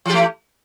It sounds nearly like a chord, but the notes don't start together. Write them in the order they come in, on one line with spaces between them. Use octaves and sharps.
E3 G4 A3